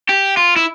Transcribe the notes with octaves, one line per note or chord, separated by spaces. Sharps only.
G4
F4
E4